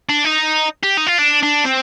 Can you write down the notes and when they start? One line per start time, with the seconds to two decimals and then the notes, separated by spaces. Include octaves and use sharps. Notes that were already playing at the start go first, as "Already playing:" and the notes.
0.09 D4
0.25 D#4
0.83 G4
0.97 D#4
1.06 F4
1.18 D4
1.43 D4
1.65 C4